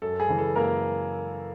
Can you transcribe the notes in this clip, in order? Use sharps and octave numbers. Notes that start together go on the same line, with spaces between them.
F#2 A4
G#4
C#3 E3
A4
F#2 A#3 A#4